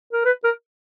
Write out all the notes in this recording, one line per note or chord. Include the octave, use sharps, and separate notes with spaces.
A#4
B4
A#4